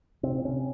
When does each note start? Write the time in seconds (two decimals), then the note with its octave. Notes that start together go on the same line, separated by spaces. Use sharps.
0.23 C3 C4
0.45 C3 C#4